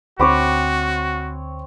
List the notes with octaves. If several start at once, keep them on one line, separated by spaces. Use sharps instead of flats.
D2 C4 F#4 C#5 B5 C#6 D6